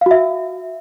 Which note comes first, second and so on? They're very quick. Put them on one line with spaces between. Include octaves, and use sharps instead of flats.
F5 F#4 E5